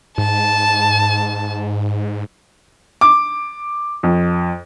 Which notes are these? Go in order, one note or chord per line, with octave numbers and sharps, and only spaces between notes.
G#2 A5
D6
F2